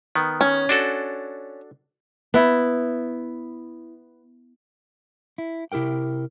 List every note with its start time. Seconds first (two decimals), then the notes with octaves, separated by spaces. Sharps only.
0.15 D#3 B3
0.41 C#4
0.69 D4 F#4 A4
2.34 B3 E4
5.38 E4
5.72 C3 E4 G4 A#4 G5